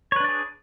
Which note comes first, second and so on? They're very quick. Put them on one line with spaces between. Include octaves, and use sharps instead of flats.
C#5 B4 D4 D5 G#4